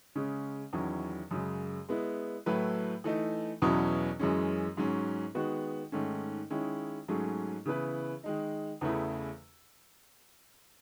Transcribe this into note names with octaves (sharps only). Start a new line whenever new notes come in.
C#3 G#3 C#4
E2 D#3 F#3 C#4 E4
F#2 C#3 G#3
G#3 B3 E4
A2 F#3 A3 E4 B4
E3 A3 D#4
E2 B2 F#3 C#4 E4
F#2 E3 G#3 C#4
G#2 F#3 C#4
D#3 G#3 B3 F#4
G#2 D#3 A3 C#4
D#3 G#3 C#4 E4
G#2 F#3 A3 C#4 G#4
C#3 E3 B3 E4 B4
D#3 G#3 D#4
E2 C#3 E3 A3 E4